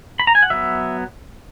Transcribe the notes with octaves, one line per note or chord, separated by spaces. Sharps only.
B5
A#5
G#5
F#5
F#3 B3 E5